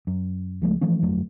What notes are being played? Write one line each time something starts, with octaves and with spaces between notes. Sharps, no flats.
F#2
C#2 F3 G#3 A3
E3 F3 A3 C#4
G1 F2 F#3 A3